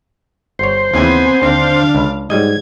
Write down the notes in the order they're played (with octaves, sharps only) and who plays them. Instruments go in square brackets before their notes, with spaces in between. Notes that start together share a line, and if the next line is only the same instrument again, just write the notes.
[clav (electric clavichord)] G1 C#5 [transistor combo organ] C5
[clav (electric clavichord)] D#2 C#3 E3 [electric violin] B3 G#5 [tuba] C4
[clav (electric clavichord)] D#2 C4 [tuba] D3 [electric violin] D4 F5
[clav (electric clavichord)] C#2
[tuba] G#2 [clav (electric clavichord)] F#3 G3 D#5 [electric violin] G#6